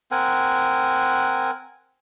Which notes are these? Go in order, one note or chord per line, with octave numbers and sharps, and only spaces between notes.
C4 A#4 F#5 G#5